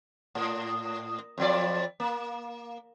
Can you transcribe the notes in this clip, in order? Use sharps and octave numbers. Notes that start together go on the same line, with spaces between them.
A2
F2 F3 D5
A#3